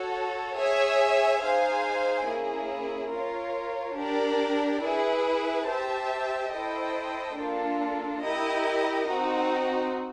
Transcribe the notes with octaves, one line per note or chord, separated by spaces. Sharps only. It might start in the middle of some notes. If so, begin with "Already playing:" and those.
Already playing: F#4 A4 C#5
G#4 C#5 E5 G#5
D#4 G#4 C5 F5 G#5
A#3 C#4 E4 G#4
F4 A#4 C#5
D4 G4 A#4 D5
E4 G#4 B4
G4 C5 E5 A5
E4 A4 C5 D#5 G5
A#3 D4 F4 A4
E4 G4 A#4 D#5
C4 D#4 F#4